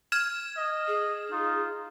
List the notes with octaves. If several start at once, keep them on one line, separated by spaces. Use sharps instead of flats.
F6 G#6 E7
D#5
G#4
D#4 F4